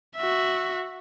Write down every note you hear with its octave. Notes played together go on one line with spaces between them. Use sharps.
F#4 E5